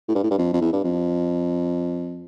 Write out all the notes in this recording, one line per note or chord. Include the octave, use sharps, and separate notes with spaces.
A2
G2
A2
G2
F2
F2
E2
G2
F2